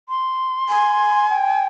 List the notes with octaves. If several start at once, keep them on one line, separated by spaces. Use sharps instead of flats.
C6
G#5
G5